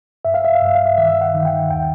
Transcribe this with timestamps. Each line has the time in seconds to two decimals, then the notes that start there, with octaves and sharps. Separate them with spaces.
0.25 G2 E5
0.34 F5
0.45 E5
0.55 F5
0.62 G2 E5
0.75 F5
0.86 E5
0.98 D#3 E5
1.21 F#5
1.34 D#3
1.45 G5
1.70 D#2 G5